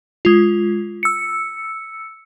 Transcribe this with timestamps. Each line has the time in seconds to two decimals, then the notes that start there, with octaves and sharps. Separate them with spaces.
0.25 G#3 F4
1.03 E6 C#7